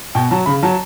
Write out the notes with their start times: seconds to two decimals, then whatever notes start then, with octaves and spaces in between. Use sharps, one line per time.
0.15 B2 G5
0.30 F#3 A5
0.46 C#3 B5
0.63 F#3 A5